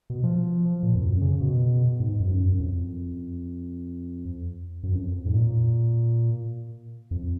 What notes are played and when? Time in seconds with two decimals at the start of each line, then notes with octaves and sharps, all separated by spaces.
0.10 B2
0.23 F3
0.83 A#2
0.95 F2
1.02 F#2
1.21 C#3
1.41 B2
2.00 G#2
2.20 F#2
2.40 F#2
2.60 F2
4.83 F#2
4.95 F2
5.26 G#2
5.34 A#2
7.11 F2